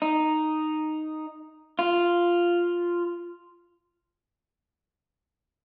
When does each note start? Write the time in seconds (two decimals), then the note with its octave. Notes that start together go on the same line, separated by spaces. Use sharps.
0.02 D#4
1.79 F4